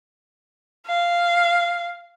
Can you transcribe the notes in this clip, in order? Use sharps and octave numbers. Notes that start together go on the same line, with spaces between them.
F5